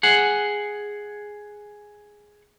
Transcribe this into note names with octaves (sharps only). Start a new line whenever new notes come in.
G#4 F#5